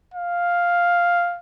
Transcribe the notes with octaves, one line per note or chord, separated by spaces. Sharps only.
F5